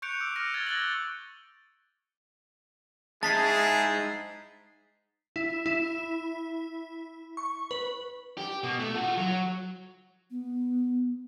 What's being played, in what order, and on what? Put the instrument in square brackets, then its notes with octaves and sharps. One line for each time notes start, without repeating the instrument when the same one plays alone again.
[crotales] C#6 F#6 G6 C#7 D7 F7
D6 E6 D7
E6 F6 A#6 D#7
E6 F6 G#6 A6 G7
F#6 A6 A#6 F#7
G7
[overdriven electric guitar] G#3 D#4 [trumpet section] E4 G#4 [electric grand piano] A5 [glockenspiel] A6 B6 C7
[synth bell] E4
E4
C#6
B4
[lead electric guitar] G4
B2
A3
F4 F#4
F#3
[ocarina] B3